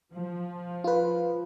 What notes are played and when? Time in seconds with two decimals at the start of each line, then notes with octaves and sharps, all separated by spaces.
0.13 F3
0.84 F4 B4